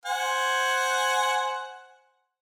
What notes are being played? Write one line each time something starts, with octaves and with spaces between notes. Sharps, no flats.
C5 F#5 G#5